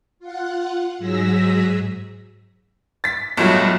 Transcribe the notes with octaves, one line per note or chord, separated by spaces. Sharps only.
F4 F#5
G#2 F#3 G#4 E6 A#6 B6
A6 B6
B1 G2 A#2 F#3 A3